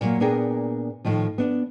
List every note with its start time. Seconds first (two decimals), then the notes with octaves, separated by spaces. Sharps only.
0.01 A#2 F#3 A#3
0.20 A#2 B3 D4 G#4 A#4 G5
1.05 A2 D#3 F3
1.38 B3 D4